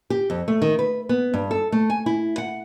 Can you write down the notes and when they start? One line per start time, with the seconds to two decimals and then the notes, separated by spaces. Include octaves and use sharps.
0.10 G4
0.30 F2
0.48 A3
0.62 D#3
0.79 B4
1.09 B3
1.34 G2
1.51 A4
1.72 A3
1.90 G#5
2.06 E4
2.38 F#5